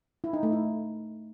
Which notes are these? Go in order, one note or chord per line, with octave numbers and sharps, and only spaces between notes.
E4
D#4
A3
E4